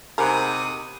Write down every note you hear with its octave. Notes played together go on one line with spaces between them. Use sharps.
C3 D#4 G#4 A#4 F#5 B5 D#6 F#6